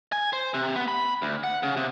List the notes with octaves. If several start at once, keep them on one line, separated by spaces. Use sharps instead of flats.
G#5
C5
C3
B3
B5
D2
F#5
C#3
C3